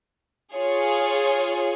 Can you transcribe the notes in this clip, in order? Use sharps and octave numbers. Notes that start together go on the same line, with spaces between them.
F4 G#4 C#5